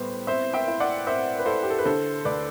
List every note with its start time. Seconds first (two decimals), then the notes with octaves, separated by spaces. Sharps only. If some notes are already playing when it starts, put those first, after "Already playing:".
Already playing: A2 G3 B3 C5
0.27 C4 C5 E5
0.54 E5 G5
0.68 E4
0.80 D5 F#5
1.06 C4 C5 E5
1.39 B4
1.46 E4 A4 C5
1.63 G4
1.70 A4
1.79 B4
1.85 D3 A4 C5
2.25 D2 B4 D5